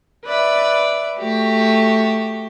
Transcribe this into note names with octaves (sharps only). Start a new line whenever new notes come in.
B4 D5 E5
A3 F#4 G4